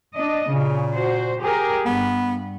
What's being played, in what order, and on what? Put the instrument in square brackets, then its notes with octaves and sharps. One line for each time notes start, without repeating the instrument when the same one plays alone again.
[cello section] D4 D#5
[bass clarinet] A#2 [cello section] C#3
[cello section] F#4 C5
G4 G#4 A#4
[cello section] G2 [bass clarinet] B3